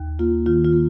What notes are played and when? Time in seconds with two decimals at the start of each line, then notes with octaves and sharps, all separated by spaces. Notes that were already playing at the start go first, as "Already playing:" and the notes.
Already playing: D#2
0.19 A#3 F4
0.46 D#3 F4
0.64 F4
0.73 A#3